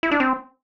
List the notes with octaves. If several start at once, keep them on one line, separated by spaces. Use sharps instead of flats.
E4
D4
C4